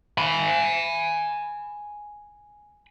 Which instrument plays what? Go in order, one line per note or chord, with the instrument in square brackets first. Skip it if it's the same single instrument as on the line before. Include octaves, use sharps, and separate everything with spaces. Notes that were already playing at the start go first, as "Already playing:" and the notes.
[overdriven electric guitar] G#5 B5